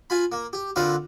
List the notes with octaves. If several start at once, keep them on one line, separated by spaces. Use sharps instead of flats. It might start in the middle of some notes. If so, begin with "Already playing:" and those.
F4 G#5 B5
A#3
G4
D3 C4 F4 A#4 B4 F5